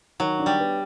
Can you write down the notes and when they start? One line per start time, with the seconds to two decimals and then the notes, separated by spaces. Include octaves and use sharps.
0.20 D#3 F#3
0.40 D4
0.46 G3
0.59 B3